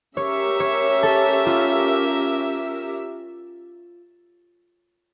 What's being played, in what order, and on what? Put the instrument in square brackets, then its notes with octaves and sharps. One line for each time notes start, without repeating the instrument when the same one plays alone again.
[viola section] C#4 G4 A#4 E5 [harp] C#5
[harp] C#5
A4
F4